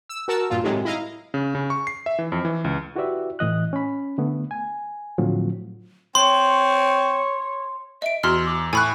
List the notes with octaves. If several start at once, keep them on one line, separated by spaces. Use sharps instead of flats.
E6
F#4 A#4 A5 E6
G2 A#2 F4
A2 C3 D#3 F#3 G#3
E4 D#5 F5 A#5
C#3
C#3
C#6
C7
E5
E3
F2
E3
C#2
E4 F#4 G4 B4 D5 E5
A2 E3 D#5 F#6
C#4 B5
D3 A3 B3
G#5
A2 D3 F3 F#3 C4 F4
C4 C#5 C6
D#5 E5 D7
E2 F#4 C6 F6
D6
A2 G#5 B5 C#6 F#6